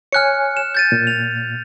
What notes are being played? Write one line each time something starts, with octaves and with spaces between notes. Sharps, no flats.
C#5 G#5 F6 F#6 C#7
E7
G6 A6 D#7
A#2
F7